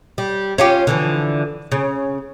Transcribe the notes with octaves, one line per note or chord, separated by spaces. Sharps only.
G3
C#4 F4 G4
D3 E3 F3
C#3